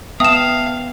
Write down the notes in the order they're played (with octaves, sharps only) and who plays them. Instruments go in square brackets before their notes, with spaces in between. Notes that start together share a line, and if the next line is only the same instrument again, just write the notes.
[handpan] B3 [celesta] E5 G5 A5 [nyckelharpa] F5 [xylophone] D#6 E7